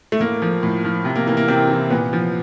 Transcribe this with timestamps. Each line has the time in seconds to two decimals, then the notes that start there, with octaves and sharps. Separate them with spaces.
0.12 A3
0.20 A2 A#3
0.42 F3
0.63 A2
0.85 F3
1.05 C3
1.16 A#3
1.27 E3 A#3
1.37 A#3
1.48 C3 C4
1.69 E3
1.90 A#2 B3
2.13 F3